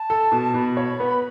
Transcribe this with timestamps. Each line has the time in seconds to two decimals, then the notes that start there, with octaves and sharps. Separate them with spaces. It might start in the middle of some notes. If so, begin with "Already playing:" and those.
Already playing: A5
0.10 A4
0.32 B2
0.54 B2 B5
0.77 C#5
1.00 B3